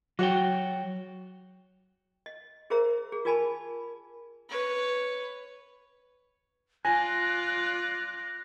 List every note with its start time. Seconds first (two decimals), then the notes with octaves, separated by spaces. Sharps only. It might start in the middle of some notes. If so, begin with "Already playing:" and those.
0.19 F#3 F#4 C#5 G5
2.26 D#5
2.70 G#4 A#4 C5 E5 A#5
3.12 G#4
3.25 F4 A#4 D5 G#5 A5 B5
4.49 B4 C#5
6.85 F4 D5 G#5 F#6 A#6